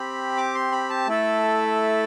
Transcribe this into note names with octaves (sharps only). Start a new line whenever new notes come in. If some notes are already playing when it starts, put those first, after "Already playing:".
Already playing: C4 G4 B5
D6
C6
B5
A5
A3 E4 A4